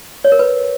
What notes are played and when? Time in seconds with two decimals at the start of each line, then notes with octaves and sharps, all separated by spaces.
0.24 C#5
0.32 A#4
0.39 B4